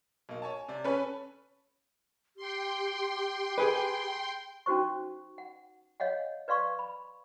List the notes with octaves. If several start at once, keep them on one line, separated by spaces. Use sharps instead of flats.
B1 A#3
C#5 G#5 A5
C3 D5
C#4 A4 B4 C#6
G4 G5 C6
G#4 B4
C#4 D#4 F#4 C5 C#6
F#5
C#5 D#5 F5 F#5
B4 D5 F5 C6 C#6
B5